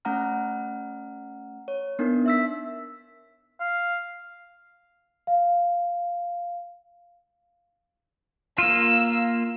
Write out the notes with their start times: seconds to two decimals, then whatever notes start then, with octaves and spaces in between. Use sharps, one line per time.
0.05 A3 C#4 F#5 A#5 F6
1.68 C#5
1.99 B3 D4 D#4 A#4
2.26 E5 E6 B6
3.60 F5
5.27 F5
8.58 A#3 F4 E6